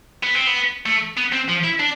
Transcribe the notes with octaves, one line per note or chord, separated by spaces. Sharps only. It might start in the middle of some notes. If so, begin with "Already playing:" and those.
B3
C4
B3
A3
B3
C4
F3
E4
D4